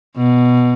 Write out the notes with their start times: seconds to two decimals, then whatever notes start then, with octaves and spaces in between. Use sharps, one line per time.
0.16 B2